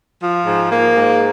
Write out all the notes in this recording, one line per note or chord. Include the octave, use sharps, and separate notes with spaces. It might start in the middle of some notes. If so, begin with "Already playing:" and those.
F3
G#2
A#3
G#2